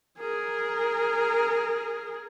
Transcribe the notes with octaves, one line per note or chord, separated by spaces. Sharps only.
G#4 A#4